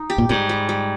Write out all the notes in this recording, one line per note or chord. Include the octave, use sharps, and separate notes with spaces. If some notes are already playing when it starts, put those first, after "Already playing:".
Already playing: D#4
G4
A#2
G#2 G3
G3
G3